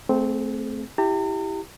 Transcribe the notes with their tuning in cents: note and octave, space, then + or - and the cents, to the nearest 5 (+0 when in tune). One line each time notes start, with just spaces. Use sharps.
A3 +0 C4 -10 G#4 +35
E4 +0 G4 +0 A#5 -45